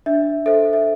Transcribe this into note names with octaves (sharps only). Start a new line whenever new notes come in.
D4 E5
A4 C5 E5
E5